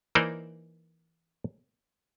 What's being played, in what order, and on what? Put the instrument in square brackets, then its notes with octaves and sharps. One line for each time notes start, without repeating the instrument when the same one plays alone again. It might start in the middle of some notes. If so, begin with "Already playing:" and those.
[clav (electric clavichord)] E3 A#3 D#4 A#4 C5 D5